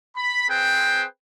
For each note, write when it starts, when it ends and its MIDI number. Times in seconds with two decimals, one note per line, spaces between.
0.16 0.47 83
0.49 1.04 60
0.49 1.04 68
0.49 1.04 71
0.49 1.04 72
0.49 1.04 79